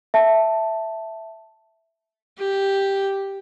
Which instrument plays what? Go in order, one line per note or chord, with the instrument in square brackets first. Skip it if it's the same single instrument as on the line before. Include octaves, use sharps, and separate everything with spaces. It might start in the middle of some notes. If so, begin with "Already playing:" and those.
[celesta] E5 A5
[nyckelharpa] G4